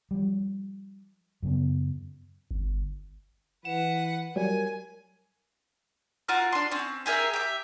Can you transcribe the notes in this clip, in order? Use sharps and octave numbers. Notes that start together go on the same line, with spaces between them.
F3 G3
F#2 C#3 B3
G1
E3 B4 F#5 E7
F#3 G3 A#4 G#5
F4 F#4 A#4 F6
D4 C6
C4 C#4
G4 G#4 A#4 E5
G4 E5